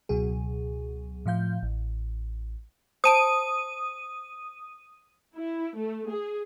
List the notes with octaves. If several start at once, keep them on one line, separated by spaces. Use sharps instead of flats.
C#2 B2 F#3 G#4
A2 F3 F5 G6
A1
C5 A5 D#6 D7 D#7
E4
A3
G#4